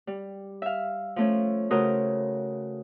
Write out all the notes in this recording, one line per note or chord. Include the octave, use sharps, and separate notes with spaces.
G3
E5 F5
F3 A3 C#4
C#3 A3 F#4 A#4 C5 D#6